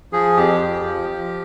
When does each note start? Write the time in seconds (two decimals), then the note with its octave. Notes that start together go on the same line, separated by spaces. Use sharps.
0.13 F3 G#4
0.37 F2 G4
0.60 F3
0.86 F3
1.10 F3